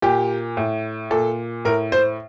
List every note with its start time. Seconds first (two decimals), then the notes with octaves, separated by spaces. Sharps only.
0.02 A#2 G4
0.57 A2
1.11 A#2 A4
1.65 A2 A#4
1.92 C5